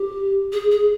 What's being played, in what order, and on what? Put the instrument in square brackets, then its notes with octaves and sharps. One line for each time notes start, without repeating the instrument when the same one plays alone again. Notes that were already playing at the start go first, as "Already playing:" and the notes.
Already playing: [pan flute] G4
G#4
G#4